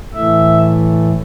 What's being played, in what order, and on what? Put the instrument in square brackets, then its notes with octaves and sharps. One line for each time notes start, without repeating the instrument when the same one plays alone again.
[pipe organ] A2 E3 A3 E5